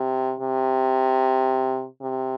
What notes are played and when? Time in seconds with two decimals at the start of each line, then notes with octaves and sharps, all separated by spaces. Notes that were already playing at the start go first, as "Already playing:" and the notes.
Already playing: C3
0.40 C3
2.02 C3